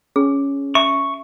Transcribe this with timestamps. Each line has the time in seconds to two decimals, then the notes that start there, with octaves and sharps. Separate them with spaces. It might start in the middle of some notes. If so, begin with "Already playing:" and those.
0.16 C#4 G#4
0.75 E5 C#6